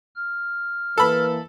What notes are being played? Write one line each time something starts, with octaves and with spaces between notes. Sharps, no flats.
F6
E3 A#3 A4 B4 B5